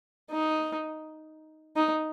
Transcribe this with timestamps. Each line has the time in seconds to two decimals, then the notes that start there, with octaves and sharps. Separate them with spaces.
0.31 D#4
1.76 D#4